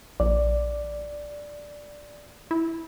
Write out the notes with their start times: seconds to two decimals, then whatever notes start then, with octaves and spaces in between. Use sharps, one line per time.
0.20 A#1 D5
2.51 E4